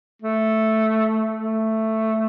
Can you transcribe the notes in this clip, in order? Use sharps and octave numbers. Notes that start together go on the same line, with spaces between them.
A3
A3